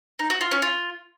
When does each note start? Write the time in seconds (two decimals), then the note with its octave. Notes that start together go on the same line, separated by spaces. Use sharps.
0.19 D#4
0.30 F#4
0.41 F4
0.51 C#4
0.62 F4